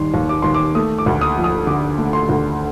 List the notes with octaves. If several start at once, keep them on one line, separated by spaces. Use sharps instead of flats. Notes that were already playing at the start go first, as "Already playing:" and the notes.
Already playing: D#2 D#3 G3 C6
D#2
D6
D#2 C6
D6
A3 D#6
D6
D2
D#6
F3
D#6
D3 D6
A3
C6
D2